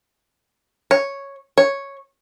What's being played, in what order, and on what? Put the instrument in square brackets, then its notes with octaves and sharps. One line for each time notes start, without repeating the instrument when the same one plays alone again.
[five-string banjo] C#5
C#5